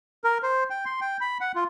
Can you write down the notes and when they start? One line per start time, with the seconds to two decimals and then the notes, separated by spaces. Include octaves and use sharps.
0.24 A#4
0.43 C5
0.70 G5
0.85 C6
1.01 G5
1.21 B5
1.41 F#5
1.55 F4